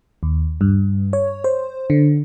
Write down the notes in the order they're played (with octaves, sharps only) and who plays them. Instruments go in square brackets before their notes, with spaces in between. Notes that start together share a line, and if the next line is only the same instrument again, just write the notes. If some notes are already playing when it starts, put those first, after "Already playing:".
[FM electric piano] D#2
G2
C#5
C5
D3